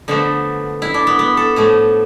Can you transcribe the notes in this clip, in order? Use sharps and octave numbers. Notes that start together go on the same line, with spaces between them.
D3 F3 A3 B3
E4
D4
B3
B3
A4
A2 F3 A3